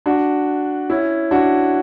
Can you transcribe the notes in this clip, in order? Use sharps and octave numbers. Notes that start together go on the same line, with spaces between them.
D4 F#4
C#4 E4
D4 F#4